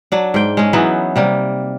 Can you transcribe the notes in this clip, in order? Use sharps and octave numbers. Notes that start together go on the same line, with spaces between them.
F#3 D4
G#2 G5
G#3 C#4
E3 F#3 B3 D#4
C3 G3 A#3